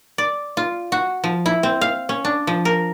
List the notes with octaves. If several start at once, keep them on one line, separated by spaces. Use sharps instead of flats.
D5
F4
F#4
F3
E4
C4
F5
C#4
D4
F3
A#4